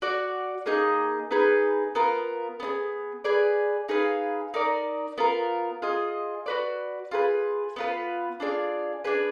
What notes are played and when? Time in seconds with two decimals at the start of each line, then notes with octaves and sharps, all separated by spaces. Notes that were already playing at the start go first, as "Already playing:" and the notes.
0.02 F#4 D5 F#5
0.66 A#3 D#4 G#4 D#5
1.31 B3 D#4 G#4 B4
1.95 B3 F4 A#4
2.60 B3 D4 G#4
3.24 G#4 B4 D5
3.89 D#4 G#4 B4 F5
4.54 D#4 A#4 D5
5.18 B3 F4 A#4
5.82 F4 G#4 D#5
6.46 F#4 B4 D5
7.11 F4 G#4 B4
7.76 B3 F4 B4
8.40 D4 F4 G#4 D5
9.04 D4 G#4 B4